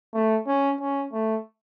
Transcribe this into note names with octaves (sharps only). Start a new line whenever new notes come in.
A3
C#4
C#4
A3